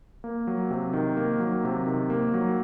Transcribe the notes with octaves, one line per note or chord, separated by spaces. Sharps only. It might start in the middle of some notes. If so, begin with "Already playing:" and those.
A#3
F#3
C3
D#3
A#3
F#3
C3
D#3
A#3
F#3